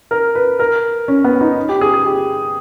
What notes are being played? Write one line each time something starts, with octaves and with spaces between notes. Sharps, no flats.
A#4
B4
A#4
C#4
B3
D#4
G4
G#4
G#4
G4